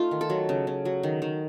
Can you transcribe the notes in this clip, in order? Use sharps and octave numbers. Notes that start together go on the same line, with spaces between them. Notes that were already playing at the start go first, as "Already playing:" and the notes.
Already playing: A3 D#4 F4
D#3
A4
F#3
C#3
C#3
F#3
D#3
D#3